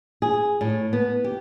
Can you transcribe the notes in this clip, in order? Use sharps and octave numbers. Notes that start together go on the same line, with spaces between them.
G#4
A2
B3
G4